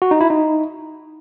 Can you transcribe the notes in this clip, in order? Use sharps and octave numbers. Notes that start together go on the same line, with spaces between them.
F#4
D#4
E4
D#4